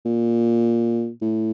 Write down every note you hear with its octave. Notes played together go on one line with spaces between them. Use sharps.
A#2
A2